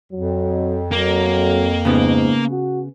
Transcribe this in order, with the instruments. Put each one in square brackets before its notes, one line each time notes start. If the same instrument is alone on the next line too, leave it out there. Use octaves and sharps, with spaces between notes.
[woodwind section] F2 [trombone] F#3
[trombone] F#3 [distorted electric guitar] A#3
[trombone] G#2 [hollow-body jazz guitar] C#3 B3
[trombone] F#4